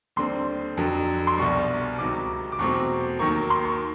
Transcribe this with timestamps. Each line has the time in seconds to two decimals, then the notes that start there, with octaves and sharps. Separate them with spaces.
0.16 D#2 D3 G3 C4 C6
0.77 F2 D3 F#3
1.27 C6
1.37 C2 B2 G3 C#6
1.98 C#2 C3 D#3 F#3 D6
2.52 D6
2.59 E2 B2 F#3 A3 C4 C#6
3.19 D#2 D#3 F#3 A#3 C#6
3.50 C6
3.65 C#6